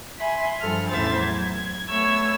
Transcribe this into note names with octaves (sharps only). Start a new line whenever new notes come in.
E5 G#5 B5 C6
G2 F3 A4 F6
E2 A2 C#3 C5 E5 A6
F#3 G#6
G#6
A3 B3 C#5 E6 G#6